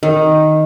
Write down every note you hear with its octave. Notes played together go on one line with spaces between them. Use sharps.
D#3